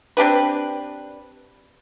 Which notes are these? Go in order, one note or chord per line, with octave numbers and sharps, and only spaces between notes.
C4 D4 G4 B4